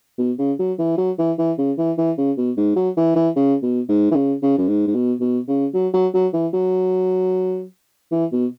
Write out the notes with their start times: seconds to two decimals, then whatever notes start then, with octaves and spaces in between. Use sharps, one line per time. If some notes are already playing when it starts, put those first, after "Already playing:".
0.18 B2
0.38 C#3
0.59 F#3
0.79 E3
0.98 F#3
1.18 E3
1.38 E3
1.58 C#3
1.78 E3
1.98 E3
2.18 C#3
2.37 B2
2.57 G#2
2.76 F#3
2.97 E3
3.15 E3
3.36 C#3
3.62 B2
3.88 G#2
4.11 E3
4.15 C#3
4.42 C#3
4.58 F#2
4.68 G#2
4.87 G#2
4.95 B2
5.20 B2
5.48 C#3
5.74 F#3
5.94 F#3
6.14 F#3
6.33 E3
6.53 F#3
8.11 E3
8.32 B2